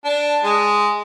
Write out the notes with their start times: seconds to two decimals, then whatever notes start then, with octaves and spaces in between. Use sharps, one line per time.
0.05 D4
0.44 G#3